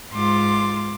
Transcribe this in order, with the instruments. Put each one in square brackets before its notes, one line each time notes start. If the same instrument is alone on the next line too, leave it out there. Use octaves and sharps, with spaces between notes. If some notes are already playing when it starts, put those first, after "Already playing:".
[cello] G#2 F4 [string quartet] C6 D6